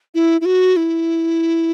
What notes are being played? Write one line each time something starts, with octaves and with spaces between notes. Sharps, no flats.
E4
E4
F#4
E4